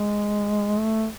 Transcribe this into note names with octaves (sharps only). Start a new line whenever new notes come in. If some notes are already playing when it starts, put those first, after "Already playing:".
Already playing: G#3
A3